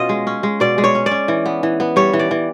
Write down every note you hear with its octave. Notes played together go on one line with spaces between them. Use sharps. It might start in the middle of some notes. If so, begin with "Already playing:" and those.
Already playing: B2 C#4 F4 D#5
G#3
C#4
G#3
B2 D5
G#3
C#5
C#4
D5
C#4
E3
B3
E3
B3
G3 C#5
E3
D5
E3